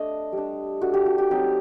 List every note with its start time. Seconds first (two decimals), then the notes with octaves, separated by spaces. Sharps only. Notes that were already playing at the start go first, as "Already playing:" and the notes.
Already playing: A3 D4 D#5
0.32 G3
0.38 D4
0.81 A3 D4 F#4
0.94 G4
1.06 F#4
1.18 G4
1.30 F#3 C4 D#4 G4